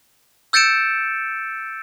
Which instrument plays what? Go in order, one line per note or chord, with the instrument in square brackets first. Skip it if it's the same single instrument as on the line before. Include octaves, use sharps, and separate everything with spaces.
[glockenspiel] E6 G6 A6 C#7 D7 E7